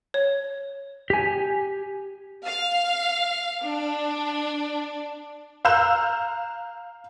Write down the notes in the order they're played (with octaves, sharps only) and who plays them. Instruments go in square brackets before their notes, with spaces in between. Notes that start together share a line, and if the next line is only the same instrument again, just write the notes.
[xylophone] C#5
[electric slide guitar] G4 G#5
[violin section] F5
D4
[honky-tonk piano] F5 A#5 E6 F#6 G6 E7